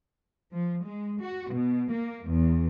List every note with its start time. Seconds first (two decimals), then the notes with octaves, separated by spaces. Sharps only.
0.52 F3
0.83 G#3
1.19 F#4
1.49 B2
1.91 A#3
2.26 E2